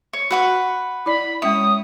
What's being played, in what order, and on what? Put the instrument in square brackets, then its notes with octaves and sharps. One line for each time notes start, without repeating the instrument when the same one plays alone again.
[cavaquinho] C#5
[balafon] F#4 [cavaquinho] B4 F#5 C#6
[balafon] E4 D5 [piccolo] B5
[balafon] G#3 C#4 E5 [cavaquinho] C#5 [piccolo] D#6